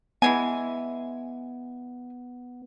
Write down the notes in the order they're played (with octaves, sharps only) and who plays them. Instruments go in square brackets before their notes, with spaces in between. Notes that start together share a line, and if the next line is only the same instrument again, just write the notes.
[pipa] E3 G#3 G#5 [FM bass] B3